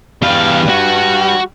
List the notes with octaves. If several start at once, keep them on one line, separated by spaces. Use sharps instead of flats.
E2 G3 B4 F5
F#4